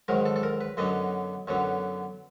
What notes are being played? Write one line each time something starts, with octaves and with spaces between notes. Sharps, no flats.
G#2 D#3 F#3 A#4
A4
A4
A#4
B4
F#2 D3 F#3 B3 D#5
F#2 D3 F#3 B3